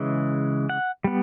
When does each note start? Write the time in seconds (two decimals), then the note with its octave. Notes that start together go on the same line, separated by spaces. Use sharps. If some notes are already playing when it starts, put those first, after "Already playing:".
Already playing: C#3 E3 G#3
0.69 F#5
1.04 G3 B3